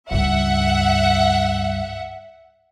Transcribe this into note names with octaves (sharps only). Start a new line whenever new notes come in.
C#2 G2 E5 F#5